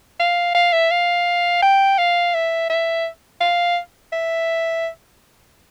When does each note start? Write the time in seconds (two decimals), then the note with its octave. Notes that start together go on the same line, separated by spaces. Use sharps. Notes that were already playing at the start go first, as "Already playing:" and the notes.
0.20 F5
0.55 F5
0.73 E5
0.91 F5
1.63 G5
1.98 F5
2.34 E5
2.70 E5
3.41 F5
4.13 E5